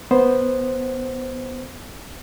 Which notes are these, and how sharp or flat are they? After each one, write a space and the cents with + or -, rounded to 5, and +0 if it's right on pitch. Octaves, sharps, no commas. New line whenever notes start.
B3 +0 C5 +0